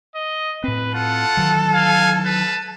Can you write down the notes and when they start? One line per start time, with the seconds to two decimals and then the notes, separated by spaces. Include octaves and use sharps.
0.15 D#5
0.64 A2 C4 B4
0.94 F4 A4 F#5
1.37 D#3 E3 F#3
1.74 F5 G#5
2.25 B4 A5